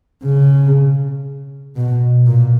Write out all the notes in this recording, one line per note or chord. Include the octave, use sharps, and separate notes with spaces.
C#3
B2
A#2